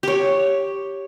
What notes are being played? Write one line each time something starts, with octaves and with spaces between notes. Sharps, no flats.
G4 C#5